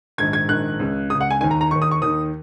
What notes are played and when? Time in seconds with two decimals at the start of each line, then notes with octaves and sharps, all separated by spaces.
0.18 A#1 G#2 D#3 G#6
0.33 G#6
0.49 A#1 G#2 D#3 F#6
0.79 C#2 C#3
1.10 C#3 D#6
1.15 C#2
1.21 F#5
1.31 G#5
1.41 D#2 D#3 G#5
1.51 A#5
1.61 A#5
1.71 D#2 D#3 C#6
1.82 D#6
1.91 C#6
2.02 D#2 D#3 D#6